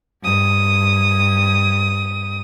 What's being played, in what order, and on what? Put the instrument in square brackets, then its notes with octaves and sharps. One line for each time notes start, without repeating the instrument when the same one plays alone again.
[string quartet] G2 D#6